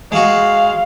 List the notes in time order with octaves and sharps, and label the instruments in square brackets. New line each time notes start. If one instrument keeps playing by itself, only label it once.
[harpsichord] G#3 F#4 [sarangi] F5